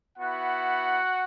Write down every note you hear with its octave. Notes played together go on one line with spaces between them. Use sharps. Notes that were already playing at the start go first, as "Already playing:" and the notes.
B3 E4 F#4 F#5